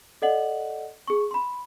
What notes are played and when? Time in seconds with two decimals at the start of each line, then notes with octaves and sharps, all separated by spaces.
0.22 A4 D5 D#5 F#5 F#7
1.08 G#4 C#6
1.31 B5 C6